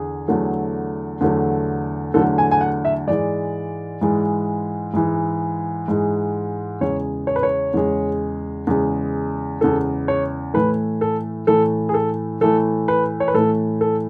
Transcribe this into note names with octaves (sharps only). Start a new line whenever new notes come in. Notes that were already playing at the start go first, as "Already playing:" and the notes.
Already playing: E2 D3 G#4
E2 D3 F#3 A3
E2 D3 F#3 A3
E2 D3 F#3 A3 A4
G#5
G#5
F#5
E5
G#2 E3 G#3 D5
G#2 E3 G#3
G#2 E3 G#3
G#2 E3 G#3
E2 C#3 G#3 C#5
C#5
B4
C#5
E2 C#3 G#3
E2 C#3 G#3
E2 C#3 G#3 A4
C#5
A2 E3 A3 B4
A4
A2 E3 A3 A4
G#4
A4
A2 E3 A3 A4
B4
C#5
B4
A2 E3 A3 A4
A4